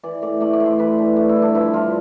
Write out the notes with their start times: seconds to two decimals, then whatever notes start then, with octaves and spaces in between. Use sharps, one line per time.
0.03 E3 D5
0.22 A2 D5
0.41 A3 D5
0.53 D5
0.60 A2
0.66 C5
0.79 E3 B4
0.98 D4
1.16 A3 D4
1.29 E4
1.36 G2
1.42 D4
1.55 F3 E4
1.74 G2 F4